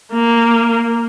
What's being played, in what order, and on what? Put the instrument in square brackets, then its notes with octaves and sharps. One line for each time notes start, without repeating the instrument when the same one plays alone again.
[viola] A#3